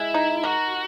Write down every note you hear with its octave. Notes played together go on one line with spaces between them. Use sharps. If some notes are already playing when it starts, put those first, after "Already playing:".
Already playing: G#3 E4
D#4
F#4 A#4